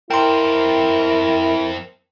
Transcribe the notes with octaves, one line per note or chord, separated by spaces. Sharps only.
F2 C4 E4 A#4 G5 A#5 C6